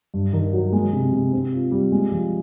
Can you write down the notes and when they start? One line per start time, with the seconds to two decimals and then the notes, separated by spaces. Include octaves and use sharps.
0.14 G2
0.33 D#3
0.53 F#3
0.73 G#3
0.93 C3
1.13 C3
1.33 C4
1.53 F4
1.72 G3
1.92 G#3
2.12 F3